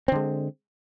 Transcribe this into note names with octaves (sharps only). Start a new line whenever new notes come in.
D3 G#3 C4